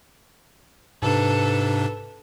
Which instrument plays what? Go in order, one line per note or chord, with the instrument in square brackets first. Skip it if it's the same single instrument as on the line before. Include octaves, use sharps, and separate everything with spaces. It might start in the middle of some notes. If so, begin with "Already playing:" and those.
[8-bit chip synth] G#2 C3 D4 [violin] A4 B4